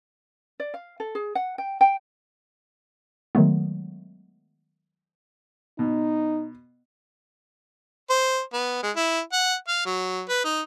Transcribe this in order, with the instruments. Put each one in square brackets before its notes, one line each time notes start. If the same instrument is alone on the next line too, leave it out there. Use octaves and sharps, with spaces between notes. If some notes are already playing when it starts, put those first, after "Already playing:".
[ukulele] D5
F5
A4
G#4
F#5
G5
G5
[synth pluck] D#3 F#3 G#3 A3 B3
[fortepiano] B2 [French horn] D#4
[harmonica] C5
B3
G#3
E4
F#5
F5
F#3
B4
D#4